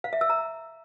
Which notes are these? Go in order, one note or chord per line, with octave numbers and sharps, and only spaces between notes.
F5
E5
E6
A#5